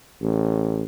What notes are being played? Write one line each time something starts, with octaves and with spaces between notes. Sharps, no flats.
A1